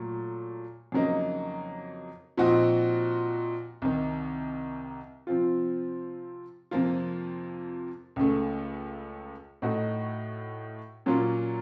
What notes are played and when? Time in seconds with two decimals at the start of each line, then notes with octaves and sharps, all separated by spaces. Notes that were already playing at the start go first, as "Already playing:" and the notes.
Already playing: A#2 F#3 A3
0.92 F2 C#3 F#3 A#3 D#4
2.37 A#2 F3 C4 D#4 F#4
3.82 C2 C3 D#3
5.27 C3 F3 C4 F4
6.71 F2 C3 F3 A#3 F4
8.16 C#2 C#3 A3
9.62 A2 A3 D#4 F#4
11.06 A#2 F#3 A#3 C#4 F4